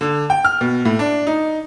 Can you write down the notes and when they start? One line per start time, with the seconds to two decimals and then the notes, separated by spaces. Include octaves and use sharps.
0.01 D3
0.30 G5
0.45 F6
0.61 B2
0.85 A2
0.99 D4
1.27 D#4